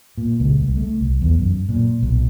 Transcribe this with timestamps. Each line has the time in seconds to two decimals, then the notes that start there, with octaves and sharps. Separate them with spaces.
0.18 A#2
0.40 C#2
0.60 C2
0.77 A3
1.01 C2
1.22 E2
1.39 F#2
1.69 A#2
2.02 B1